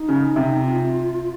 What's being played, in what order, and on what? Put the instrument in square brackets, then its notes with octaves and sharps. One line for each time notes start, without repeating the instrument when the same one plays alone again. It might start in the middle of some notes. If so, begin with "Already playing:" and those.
Already playing: [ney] D#4
[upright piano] C#3
C3
[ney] F4